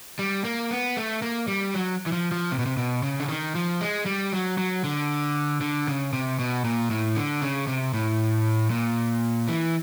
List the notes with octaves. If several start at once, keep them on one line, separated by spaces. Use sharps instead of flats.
G3
A#3
B3
A3
A#3
G3
F#3
E3
F3
F3
C3
B2
C3
B2
C#3
D3
D#3
F3
G#3
G3
F#3
F#3
D3
D3
C#3
C3
B2
A#2
A2
D3
C#3
C3
A2
A#2
E3